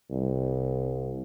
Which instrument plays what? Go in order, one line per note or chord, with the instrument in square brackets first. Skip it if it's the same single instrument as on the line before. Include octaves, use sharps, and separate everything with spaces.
[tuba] C2